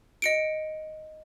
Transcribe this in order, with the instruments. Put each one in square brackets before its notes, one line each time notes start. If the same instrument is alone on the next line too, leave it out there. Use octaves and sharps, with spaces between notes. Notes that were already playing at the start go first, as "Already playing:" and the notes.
[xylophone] D#5 C#7 D7